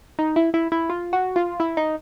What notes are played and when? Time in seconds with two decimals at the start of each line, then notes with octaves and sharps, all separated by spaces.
0.19 D#4
0.36 E4
0.54 E4
0.72 E4
0.90 F4
1.13 F#4
1.36 F4
1.60 E4
1.77 D#4